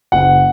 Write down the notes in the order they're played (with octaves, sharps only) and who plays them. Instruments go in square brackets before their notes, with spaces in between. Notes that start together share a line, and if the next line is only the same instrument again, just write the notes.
[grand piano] F#1 F#5